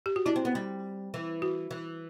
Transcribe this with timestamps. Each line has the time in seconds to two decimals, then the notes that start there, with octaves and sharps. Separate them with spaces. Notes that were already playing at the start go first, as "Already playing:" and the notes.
0.06 G4
0.16 F#4
0.26 D4 E4
0.36 C4
0.45 B3
0.55 G3
1.14 E3
1.42 F#4
1.71 E3